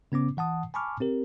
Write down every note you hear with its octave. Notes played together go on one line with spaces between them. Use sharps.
C#3 B3 C#4 D6
E3 F#5 A5 D#6
G#5 A5 B5 C#6 D6 F6
C4 G4 A#4